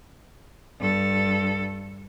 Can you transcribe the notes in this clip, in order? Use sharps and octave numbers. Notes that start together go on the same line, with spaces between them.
G2 A4